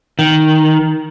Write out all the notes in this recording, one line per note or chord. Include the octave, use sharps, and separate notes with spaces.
D#3